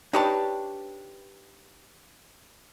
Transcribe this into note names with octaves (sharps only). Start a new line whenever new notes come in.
D4 D#4 G4 B4 C#5 A5